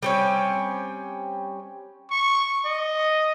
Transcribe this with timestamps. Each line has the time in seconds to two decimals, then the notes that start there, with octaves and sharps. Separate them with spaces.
0.03 G3 C4 C#4
2.11 C#6
2.65 D#5